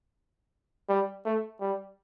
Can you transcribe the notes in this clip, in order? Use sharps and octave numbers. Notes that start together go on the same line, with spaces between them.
G3
A3
G3